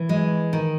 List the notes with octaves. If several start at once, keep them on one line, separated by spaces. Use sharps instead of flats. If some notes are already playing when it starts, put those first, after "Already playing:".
Already playing: E3
G#3
D#3